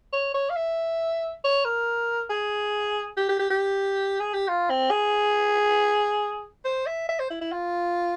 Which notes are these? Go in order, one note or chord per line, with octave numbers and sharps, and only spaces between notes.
C#5
C#5
F5
E5
C#5
A#4
G#4
G4
G4
G4
G4
G#4
G4
F4
C4
G#4
C5
E5
E5
C5
E4
E4
F4